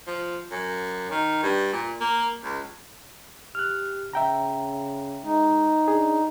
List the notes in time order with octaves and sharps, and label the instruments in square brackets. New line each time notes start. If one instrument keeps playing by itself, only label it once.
[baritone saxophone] F3
F#2
D#3
G2
A#2
A#3
C#2
[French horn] G4 [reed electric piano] F6 F#6
[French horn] C#3 [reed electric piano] E5 G5 A#5
[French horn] G#3 [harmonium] D#4
[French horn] D4 [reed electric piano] G#4